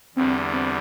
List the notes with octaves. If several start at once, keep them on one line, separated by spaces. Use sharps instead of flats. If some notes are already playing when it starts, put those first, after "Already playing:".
E2 D3 G3 C4
C4